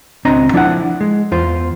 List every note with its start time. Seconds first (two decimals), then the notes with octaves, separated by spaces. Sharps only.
0.25 C#2 C4 D4 D#5 A#5
0.53 F3 D4 E4 F#5
1.01 G#3
1.32 E2 F4 C5